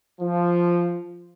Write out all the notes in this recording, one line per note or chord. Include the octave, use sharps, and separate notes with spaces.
F3